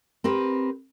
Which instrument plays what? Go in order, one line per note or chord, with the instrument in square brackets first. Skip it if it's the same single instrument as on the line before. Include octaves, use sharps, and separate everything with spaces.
[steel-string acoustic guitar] C4 G4 A#4 B4